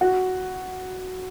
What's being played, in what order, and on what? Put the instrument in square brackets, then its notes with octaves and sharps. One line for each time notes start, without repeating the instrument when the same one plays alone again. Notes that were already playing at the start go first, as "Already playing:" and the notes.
[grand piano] F#4